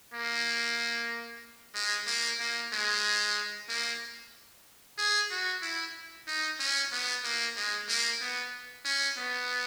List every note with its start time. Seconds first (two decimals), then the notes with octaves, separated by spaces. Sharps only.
0.14 A#3
1.75 G#3
2.07 A#3
2.40 A#3
2.72 G#3
3.69 A#3
4.98 G#4
5.31 F#4
5.62 E4
6.27 D#4
6.59 C#4
6.92 B3
7.24 A#3
7.57 G#3
7.89 A#3
8.21 B3
8.85 C#4
9.18 B3